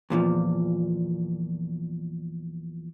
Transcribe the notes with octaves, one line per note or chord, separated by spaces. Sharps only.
E2 A#2 D3 F3